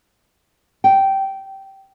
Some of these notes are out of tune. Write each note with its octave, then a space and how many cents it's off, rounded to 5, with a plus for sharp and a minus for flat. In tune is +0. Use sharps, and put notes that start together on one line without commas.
G5 -15